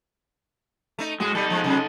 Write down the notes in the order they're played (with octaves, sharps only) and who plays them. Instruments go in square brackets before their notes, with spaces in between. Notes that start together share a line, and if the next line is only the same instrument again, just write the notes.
[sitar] A3 D#4
[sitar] A2 F#4 [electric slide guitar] G#3 G#4
[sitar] G3 [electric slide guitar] D#4 A4
[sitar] F3 G#3
C3 F#3 G#3